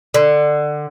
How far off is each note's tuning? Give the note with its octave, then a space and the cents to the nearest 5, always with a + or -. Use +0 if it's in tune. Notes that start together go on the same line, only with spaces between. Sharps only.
D3 +20